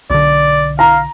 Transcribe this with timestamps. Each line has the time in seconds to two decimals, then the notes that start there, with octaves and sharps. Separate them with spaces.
0.10 B1 D3 D5
0.79 F5 A#5